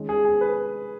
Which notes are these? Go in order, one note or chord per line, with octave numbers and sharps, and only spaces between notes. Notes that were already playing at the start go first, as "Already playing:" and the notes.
Already playing: D#3 G#3 C#4
G#4
G#4
B4